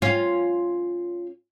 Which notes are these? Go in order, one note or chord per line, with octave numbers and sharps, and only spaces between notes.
C#4 F4